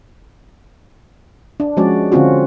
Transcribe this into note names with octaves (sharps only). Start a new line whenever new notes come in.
D4
F3 G#3 C#4 F#4 D5
D3 C4 C#4 F4 F#4